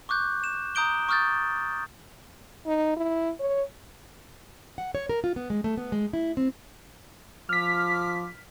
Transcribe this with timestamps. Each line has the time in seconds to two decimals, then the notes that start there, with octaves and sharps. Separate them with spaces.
0.09 C#6 D6 F#6 G6
0.44 E7
0.75 A#5 D#6 G6 D7 G7
1.09 C#6 D#6 F6 G6 A6
2.66 D#4
2.97 E4
3.40 C#5
4.78 F#5
4.95 C#5
5.09 A#4
5.24 F4
5.36 B3
5.50 G#3
5.64 A3
5.77 B3
5.92 G#3
6.13 E4
6.37 C4
7.49 F3 D6 F6 B6